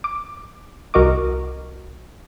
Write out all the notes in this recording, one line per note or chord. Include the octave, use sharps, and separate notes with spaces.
D6
C2 F#4 A#4 D#5 C#6 D6